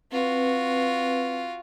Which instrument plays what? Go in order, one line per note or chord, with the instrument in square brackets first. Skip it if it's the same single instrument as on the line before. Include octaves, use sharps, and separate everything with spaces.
[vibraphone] C4 B4 [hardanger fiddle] F4 F#4